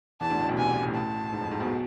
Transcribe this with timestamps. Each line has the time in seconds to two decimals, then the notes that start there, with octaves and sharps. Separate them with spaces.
0.21 E2 E3 A5
0.30 D2 D3
0.39 A1 A2
0.49 B1 B2
0.58 C2 C3 G#5
0.82 A1 A2
0.95 A5
1.32 G#2
1.41 F2
1.51 G#2
1.60 B1 B2